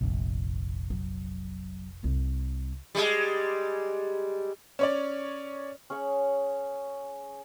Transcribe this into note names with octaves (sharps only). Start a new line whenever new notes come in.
F1 A#1
F#3
C2 G3
G3 G#3
C#4 C#5 D5
C#4 G#4 C#5 F#5